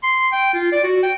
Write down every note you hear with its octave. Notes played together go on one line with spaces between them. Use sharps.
C6
G5
F4
D5
F#4
G5